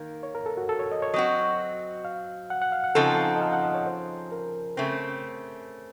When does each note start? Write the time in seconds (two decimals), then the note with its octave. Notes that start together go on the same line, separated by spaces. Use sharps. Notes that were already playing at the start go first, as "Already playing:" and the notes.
Already playing: D#3 A#3
0.23 C#5
0.35 A#4
0.46 A4
0.57 F#4
0.69 A4
0.79 C#5
0.92 D#5
1.02 C#5
1.14 F#3 C4 F#4 D#5
2.05 F5
2.50 F#5
2.62 F#5
2.72 F5
2.84 F#5
2.95 C#3 F3 C4 D#4 A4 F#5
3.09 F5
3.18 F#5
3.35 D#5
3.41 F5
3.53 F#5
3.64 D#5
3.74 C#5
3.87 C5
4.32 A#4
4.77 C#3 A3 C4